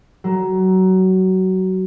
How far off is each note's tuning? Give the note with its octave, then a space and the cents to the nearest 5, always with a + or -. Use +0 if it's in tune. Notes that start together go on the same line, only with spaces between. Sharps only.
F#3 +20